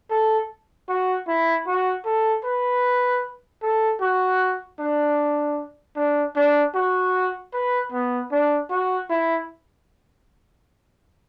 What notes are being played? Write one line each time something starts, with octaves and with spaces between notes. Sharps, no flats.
A4
F#4
E4
F#4
A4
B4
A4
F#4
D4
D4
D4
F#4
B4
B3
D4
F#4
E4